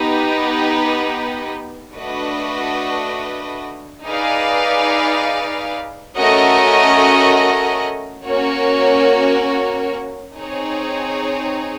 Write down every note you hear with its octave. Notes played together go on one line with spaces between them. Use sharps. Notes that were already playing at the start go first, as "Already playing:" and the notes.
Already playing: B3 D#4 G4 B4
A3 D4 F#4 B4 D#5
D#4 G#4 B4 D5 F5
A3 C#4 F#4 A#4 D#5
A#3 C#4 F#4 A#4 C#5
C4 D#4 G#4 C#5